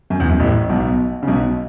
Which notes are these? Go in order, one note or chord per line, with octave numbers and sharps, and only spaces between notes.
F#2
E2
F#2
A1 A2
B1 B2
C#3
B1 B2